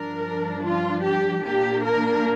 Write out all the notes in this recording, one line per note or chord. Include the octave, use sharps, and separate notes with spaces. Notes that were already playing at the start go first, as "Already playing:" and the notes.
Already playing: G2 F3 D4 A#4
F4
G4
A#2 A#3 D4 G4
A#4